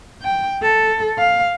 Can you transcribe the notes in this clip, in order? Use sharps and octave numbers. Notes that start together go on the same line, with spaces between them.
G5
A4
F5